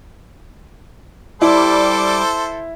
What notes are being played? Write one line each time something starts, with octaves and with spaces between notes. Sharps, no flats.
G3 E4 A4 C5 D6